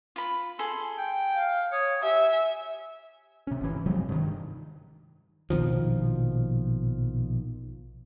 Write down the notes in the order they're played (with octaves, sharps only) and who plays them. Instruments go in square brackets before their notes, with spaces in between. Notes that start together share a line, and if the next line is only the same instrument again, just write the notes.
[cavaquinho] F4 B5
[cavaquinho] G#4 A4 [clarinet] C6
[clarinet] G5
[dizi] F5
[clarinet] C#5 [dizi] D#6
[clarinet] G4 [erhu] E5 [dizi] G#5
[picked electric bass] C3 C#4
G1 E3
C3 F3 F#3 G#3
G2 D#3
[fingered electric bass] A#1 B2 D#3 F3